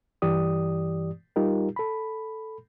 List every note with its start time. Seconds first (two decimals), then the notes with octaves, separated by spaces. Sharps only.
0.22 G2 E3 G4 D5 D#6
1.36 G3 D#4 F4 G4 A#4
1.76 A4 B5